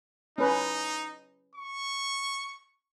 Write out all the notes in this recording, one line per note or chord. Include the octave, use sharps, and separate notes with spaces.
C#4 D#4 B4
C#6